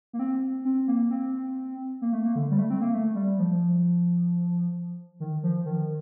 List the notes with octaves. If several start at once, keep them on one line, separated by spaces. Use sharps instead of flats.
A#3
C4
C4
A#3
C4
A#3
A3
A#3
D3
G3
A3
C4
A#3
A3
G3
F3
D#3
F3
D#3